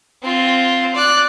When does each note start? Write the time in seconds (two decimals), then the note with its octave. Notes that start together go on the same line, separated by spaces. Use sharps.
0.23 C4 F4
0.95 D5 F#6